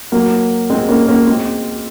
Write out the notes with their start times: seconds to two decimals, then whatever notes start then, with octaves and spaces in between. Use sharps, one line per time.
0.12 F#3 A#3
0.70 G#3 C4
0.89 A#3 C#4
1.08 A#3 C#4
1.26 G#3 C4